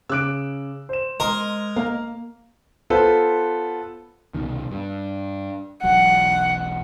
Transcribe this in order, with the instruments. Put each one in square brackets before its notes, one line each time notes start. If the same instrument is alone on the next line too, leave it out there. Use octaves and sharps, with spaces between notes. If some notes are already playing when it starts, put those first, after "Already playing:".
[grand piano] C#3 D6 D7 [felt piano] E6 F#6
[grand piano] C5 E7
[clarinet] G#3 [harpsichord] A#4 D#5 [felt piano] A#5 C6
[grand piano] A#3 [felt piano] F5 A#5
[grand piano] B3 F4 A4 B4 C5
[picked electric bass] C2 B2 D#3
G2
[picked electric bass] E1 B1 F#3 [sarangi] F#5